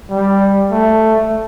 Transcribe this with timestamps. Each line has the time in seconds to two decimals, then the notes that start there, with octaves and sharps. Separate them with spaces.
0.11 G3
0.72 A3